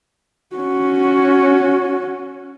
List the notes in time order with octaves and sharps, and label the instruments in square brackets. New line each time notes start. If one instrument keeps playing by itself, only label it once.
[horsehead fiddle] C#4 F#4